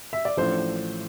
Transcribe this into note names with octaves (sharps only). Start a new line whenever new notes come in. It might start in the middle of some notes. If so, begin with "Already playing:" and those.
E5
D5
A1 A2 F3 A3 D4 C5